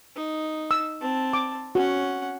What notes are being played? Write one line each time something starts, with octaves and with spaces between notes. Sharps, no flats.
D#4
E6
C4 A5
D6
C#4 F#4 F#5